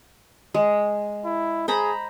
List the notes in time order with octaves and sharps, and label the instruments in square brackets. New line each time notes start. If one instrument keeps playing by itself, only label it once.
[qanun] G#3
[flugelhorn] E4
[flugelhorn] G#4 [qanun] C5 A#5 B5